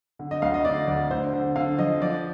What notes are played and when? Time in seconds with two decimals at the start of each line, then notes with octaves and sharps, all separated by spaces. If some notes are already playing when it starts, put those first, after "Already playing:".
0.19 D3
0.31 D#5
0.42 D2 F5
0.54 D#5
0.65 D3 D5
0.88 D2 D5
1.10 D3 C5
1.33 D3
1.56 D3 F5
1.78 F3 D#5
2.01 F3 D5